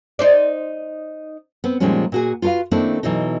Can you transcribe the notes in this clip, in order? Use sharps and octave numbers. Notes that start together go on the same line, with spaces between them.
D#4 C5 D5
B3 C4
A#2 D#3 F3 G3 G#3 C#4
A#2 F#4 G#4
F4 F#4 A4 B4 F5
D#3 A3 A#3 C4 D4 E4
B2 E3 F#3 D#4